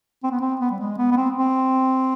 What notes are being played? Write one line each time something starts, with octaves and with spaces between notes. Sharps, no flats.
C4
B3
C4
B3
G3
G#3
B3
B3
C4
C4